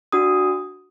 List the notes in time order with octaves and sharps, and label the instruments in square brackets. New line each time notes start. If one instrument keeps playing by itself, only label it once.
[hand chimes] D4 F#4 D#6